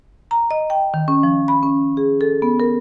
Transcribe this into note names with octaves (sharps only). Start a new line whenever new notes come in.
A#5
D#5
G5
D#3
C#4
F3
B5
C#4
G#4
A4
B3
A#4